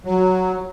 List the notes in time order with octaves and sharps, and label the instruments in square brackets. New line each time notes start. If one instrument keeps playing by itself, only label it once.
[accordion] F#3